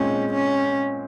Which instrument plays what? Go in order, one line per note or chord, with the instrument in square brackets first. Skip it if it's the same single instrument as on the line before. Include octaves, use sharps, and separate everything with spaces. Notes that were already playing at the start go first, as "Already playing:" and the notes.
Already playing: [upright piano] A#2 G#3 C4 D#4 [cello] C#4
[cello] C#4